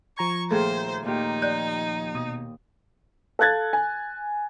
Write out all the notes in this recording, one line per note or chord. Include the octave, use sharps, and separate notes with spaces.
F3 A#5 C#6 G#6
D#2 A#2 A3 G#4 A4 C5
A#2 D#4 G4
D5 F#6 G6
B2 D#6
A4 F5 F#6 G#6 A6
G#5